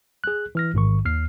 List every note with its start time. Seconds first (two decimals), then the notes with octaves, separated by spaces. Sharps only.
0.24 G#4 F#6
0.55 E3 F6 A#6
0.74 A1 G#2 D#3 C#6
1.05 D#2 F6 C7